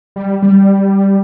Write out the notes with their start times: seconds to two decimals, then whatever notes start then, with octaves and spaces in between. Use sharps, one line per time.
0.16 G3
0.43 G3